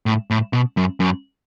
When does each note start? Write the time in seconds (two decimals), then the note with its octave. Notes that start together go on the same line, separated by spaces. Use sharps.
0.06 A2
0.30 A2
0.53 B2
0.77 F#2
1.00 F#2